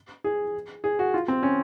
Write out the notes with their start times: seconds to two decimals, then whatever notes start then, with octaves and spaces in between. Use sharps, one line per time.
0.24 G#4
0.84 G#4
0.99 F#4
1.14 F4
1.28 C4
1.43 C#4